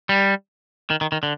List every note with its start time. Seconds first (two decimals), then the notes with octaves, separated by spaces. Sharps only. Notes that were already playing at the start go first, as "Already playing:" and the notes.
0.09 G3
0.90 D#3
1.01 D#3
1.12 D#3
1.23 D3